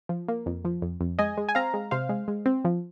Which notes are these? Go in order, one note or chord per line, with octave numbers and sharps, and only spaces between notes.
F3
A#3
F2
F3
F2
F2
G#3 D#5 G#5
G#3
G#5
C4 F5 A#5
G#3
C3 C5 F5
G#3
G#3
C4
F3